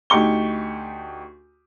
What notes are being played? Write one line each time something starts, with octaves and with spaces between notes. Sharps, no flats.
D2 D#4 G4 C#6 G7